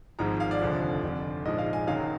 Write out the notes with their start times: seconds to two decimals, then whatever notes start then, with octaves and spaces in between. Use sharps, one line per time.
0.19 G#1 G#2 F3 A#5
0.40 F5
0.51 D5
0.61 F1 D#2 D3 F3
1.03 F1 F2 D3
1.45 A#1 G#2 F3 G#3 D#5
1.58 F5
1.73 G#5
1.87 F#1 F#2 D#3 F#3 F5